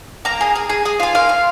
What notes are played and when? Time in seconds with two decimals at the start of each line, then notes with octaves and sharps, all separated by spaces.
0.25 A#3 A#5
0.41 G#4
0.56 G#4
0.69 G#4
0.85 G#4
1.00 F4 G#5
1.15 A#3 F5
1.29 F4